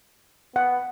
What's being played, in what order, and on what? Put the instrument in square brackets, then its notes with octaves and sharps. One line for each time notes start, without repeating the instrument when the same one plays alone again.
[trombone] B3 [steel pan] F#5